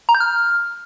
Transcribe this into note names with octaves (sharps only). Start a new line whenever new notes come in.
A#5
G6
F6